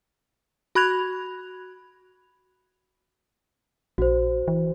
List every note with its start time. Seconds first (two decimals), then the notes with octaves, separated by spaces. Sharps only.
0.75 F#4 B5 F#6 G#6 F7
3.98 A#1 F#4 C5
4.48 E3